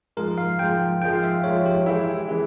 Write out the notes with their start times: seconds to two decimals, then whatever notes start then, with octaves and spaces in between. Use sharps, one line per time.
0.17 G#2 F3 G#3 A#4
0.38 F5
0.59 G#2 F3 G#3 G5
1.02 G#2 F3 G#3 G5
1.15 F5
1.23 E5
1.44 G#2 F3 G#3 C#5
1.66 G4
1.86 E3 G#3 E4
2.18 G4
2.28 E3 G#3 E4 G#4